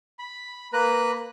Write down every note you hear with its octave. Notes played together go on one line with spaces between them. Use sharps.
B5
A#3 B4 A#5 F#6